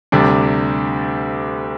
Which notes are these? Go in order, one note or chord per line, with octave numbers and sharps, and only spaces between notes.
D2 C3 G3 D4